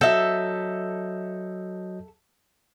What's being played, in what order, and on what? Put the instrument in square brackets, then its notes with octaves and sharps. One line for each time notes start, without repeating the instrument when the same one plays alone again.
[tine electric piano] F#3 D#5 G6 [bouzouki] A4 E5